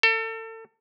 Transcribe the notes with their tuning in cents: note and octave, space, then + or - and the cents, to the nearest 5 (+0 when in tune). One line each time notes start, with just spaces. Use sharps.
A4 +35